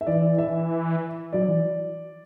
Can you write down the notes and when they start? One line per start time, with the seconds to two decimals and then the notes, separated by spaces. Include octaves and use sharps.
0.01 E5
0.07 E3 D5
0.38 E5
1.33 F#3 D5
1.48 E3